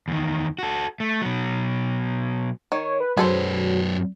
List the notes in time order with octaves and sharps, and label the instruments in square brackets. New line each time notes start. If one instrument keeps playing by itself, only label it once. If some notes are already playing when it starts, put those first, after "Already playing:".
[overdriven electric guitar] E2 D#3
F#4 A4
A3
B2 F#3
[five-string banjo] D#3 [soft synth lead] C#5
[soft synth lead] B4
[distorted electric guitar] F#2 B4 [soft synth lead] F#3 [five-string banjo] G#4 A4 C5